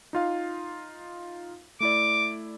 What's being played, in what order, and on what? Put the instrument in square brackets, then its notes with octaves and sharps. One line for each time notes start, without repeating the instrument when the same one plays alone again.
[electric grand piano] D#4 F4 F5
[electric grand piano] A3 E4 D5 [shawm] D6